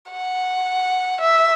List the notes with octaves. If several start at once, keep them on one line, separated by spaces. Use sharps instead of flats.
F#5
E5